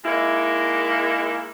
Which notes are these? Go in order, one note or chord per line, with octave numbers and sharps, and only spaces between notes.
G#3 A#3 D#4 E4